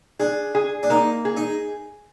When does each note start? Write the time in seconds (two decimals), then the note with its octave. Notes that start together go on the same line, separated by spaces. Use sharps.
0.19 D4 G#4
0.55 G#4
0.83 D4
0.90 A#3 D#4
1.25 G#4
1.37 D#4